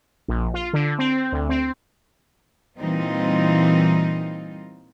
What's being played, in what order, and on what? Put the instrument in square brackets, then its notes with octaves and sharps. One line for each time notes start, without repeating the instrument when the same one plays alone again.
[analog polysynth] A#1
F4
D3
C4
D2
C4
[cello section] A#2 E3 G3 C4 D#4 F4